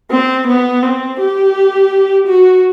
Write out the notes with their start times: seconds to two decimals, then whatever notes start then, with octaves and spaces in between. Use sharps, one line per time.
0.10 C4
0.47 B3
0.82 C4
1.20 G4
2.27 F#4